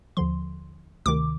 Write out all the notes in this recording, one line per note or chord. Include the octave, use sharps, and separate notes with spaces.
D#2 D3 F3 C6
D2 C3 D#3 D6